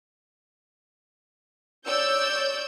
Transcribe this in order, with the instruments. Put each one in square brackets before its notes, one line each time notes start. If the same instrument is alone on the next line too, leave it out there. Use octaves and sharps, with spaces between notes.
[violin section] C#5 D5 E6 G6